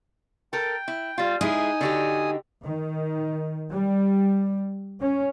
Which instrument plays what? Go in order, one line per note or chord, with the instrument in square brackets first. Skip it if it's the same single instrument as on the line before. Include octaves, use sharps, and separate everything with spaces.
[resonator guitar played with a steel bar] A4 A#4 [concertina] G5
[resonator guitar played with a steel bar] E4
G3 F4
[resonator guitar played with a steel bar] G#3 E4 G#4 [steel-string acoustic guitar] D#4 [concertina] G#5 D#6
[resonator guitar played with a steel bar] D3 F#4 G4
[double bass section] D#3
G3
C#4